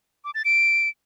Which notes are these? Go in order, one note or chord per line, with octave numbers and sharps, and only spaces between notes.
D6
A6
D7